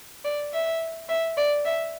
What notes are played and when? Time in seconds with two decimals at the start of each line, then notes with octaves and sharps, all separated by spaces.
0.25 D5
0.53 E5
1.09 E5
1.37 D5
1.65 E5